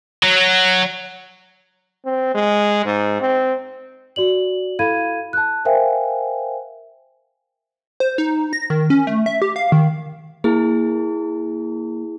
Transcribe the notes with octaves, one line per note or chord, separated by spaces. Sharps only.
F#3
C4
G#3
G#2
C4
F#4 D5 F#7
E4 A4 F5 B5 G#6 D#7
A5 F#6
A#4 C5 E5 F5 G5 G#5
C5
D#4
A#6
D#3
C#4
A3
E5
G4
F5
D#3
A#3 E4 G#4